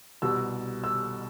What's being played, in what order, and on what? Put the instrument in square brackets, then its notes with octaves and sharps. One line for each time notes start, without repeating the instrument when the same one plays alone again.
[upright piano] C2 B2 G3 E6
E6